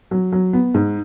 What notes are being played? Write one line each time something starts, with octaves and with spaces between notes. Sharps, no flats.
F#3
F#3
B3
G#2